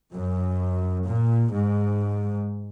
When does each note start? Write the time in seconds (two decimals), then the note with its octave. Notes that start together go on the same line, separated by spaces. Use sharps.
0.13 F#2
1.05 A#2
1.51 G#2